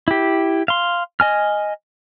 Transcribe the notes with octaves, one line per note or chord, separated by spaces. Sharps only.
E4 G4
F5 C6
D#5 G#5 F6